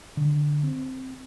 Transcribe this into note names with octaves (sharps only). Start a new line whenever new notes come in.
D3
C4